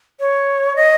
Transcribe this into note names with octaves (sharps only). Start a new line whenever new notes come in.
C#5
D#5